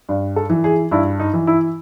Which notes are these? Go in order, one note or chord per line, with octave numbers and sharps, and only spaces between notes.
G2
A4
E3
G#4
G2 E4
D#4
E3
E4